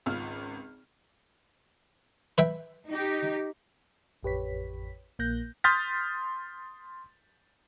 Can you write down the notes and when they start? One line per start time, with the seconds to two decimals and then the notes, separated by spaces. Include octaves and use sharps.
0.06 G#1 C#2 F4 F6
2.38 B4 E5 G5
2.88 D#4 G4
4.23 A1 F2 G4 B4 C#5 B6
5.19 A#1 A#3 F#6 G6 A#6
5.64 C6 D#6 F6 G6 A6 B6